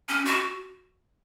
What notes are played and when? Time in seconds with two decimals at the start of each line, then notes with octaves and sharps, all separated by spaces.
0.09 C#4
0.25 F#4